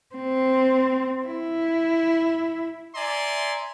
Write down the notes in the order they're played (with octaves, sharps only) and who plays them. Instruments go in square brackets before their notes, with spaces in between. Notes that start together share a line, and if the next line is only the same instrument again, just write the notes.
[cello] C4
E4
[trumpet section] D5 E5 G#5 A#5 C6